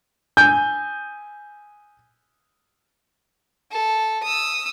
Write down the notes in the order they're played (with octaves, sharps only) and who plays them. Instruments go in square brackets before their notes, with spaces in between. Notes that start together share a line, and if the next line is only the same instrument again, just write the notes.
[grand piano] G#5 G6
[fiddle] A4
D#6 E6